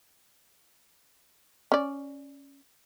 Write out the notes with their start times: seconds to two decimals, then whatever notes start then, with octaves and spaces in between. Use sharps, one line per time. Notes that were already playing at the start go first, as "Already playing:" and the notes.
1.72 C#4 D5